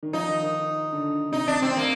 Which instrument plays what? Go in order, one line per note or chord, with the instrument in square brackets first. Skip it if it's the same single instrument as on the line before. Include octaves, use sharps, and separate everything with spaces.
[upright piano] D#3
[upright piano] F3 [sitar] D#4
[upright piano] D#3
D#3
D3
[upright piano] C3 [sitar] D#4
[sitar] D4
[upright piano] C3 [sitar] C4
[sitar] A#3